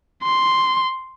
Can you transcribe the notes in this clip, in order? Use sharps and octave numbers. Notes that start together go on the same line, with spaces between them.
C6